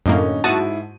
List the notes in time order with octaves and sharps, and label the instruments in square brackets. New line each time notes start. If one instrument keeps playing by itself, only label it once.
[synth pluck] F#2 A2 A#3 [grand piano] D3 C#4 D#4
[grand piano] G#2 E4 D#7 [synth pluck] F#4 A5 D#6